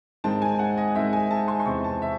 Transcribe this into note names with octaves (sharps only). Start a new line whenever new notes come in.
G#2 D#3 G#3 C4 A5
G#5
F#5
D#5
G#2 D#3 G#3 C4 E5
G#5
A5
C6
C6
E2 C3 E3 C4 C#6
A5
E5